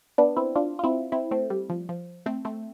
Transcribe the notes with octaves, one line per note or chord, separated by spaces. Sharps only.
B3 D4
C4 E4
D4 F4
F4
C4 E4
C4 E4
A3 C4
G3
F3
F3
A3 C4
A3 C4